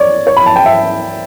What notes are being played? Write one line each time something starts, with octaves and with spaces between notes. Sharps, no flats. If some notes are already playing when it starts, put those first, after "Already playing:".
Already playing: C#5 D5
C#5
B5
A5
G5
E5